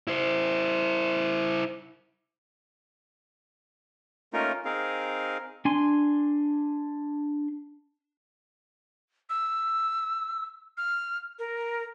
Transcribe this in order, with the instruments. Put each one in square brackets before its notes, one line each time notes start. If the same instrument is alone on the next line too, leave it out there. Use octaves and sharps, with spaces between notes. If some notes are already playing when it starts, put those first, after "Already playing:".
[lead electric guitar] E4 C5
[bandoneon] A3 A#3 C#4 D#4 F4 A#4
C4 D#4 G#4 A#4 F5
[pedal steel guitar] D4 G#5 C6
[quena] E6
F6
A#4